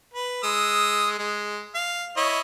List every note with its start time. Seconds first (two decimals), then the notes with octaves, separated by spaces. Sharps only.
0.13 B4
0.43 G#3 D#6 E6
1.19 G#3
1.75 F5
2.17 E4 C#5 D#5